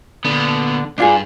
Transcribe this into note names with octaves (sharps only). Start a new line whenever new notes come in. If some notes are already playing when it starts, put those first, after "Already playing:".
A#2 D3 B3
C#2 G2 D4 F4 G#4